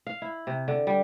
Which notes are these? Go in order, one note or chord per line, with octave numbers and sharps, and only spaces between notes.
F5
E4
C3
D3
G3